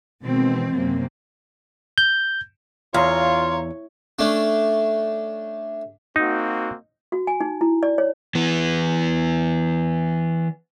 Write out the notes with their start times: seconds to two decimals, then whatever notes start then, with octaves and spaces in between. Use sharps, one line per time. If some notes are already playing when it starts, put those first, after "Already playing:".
0.22 B2 D#3 E3 G#3 C4
0.73 F#2 C3 F#3 A#3 C4
1.98 G6
2.94 E2 F4 C#5 F5 A#5 C6
4.19 A3 C#4 D4
6.16 A#3 C4 D#4 F#4
7.12 F#4
7.27 G#5
7.41 D#4
7.61 E4
7.83 D5
7.98 C#5
8.35 E3 B3